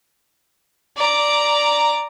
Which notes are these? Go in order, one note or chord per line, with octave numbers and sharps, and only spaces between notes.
D5 A#5